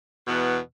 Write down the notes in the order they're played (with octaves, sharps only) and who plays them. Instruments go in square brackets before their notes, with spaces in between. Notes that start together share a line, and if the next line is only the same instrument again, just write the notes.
[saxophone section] E2 B2 B3